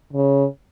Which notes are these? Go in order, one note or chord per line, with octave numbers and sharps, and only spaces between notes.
C#3